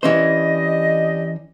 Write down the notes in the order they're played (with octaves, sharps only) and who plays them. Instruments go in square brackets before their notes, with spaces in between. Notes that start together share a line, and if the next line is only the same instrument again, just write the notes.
[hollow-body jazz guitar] E3 C#4 C5 [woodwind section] D4 G4 D#5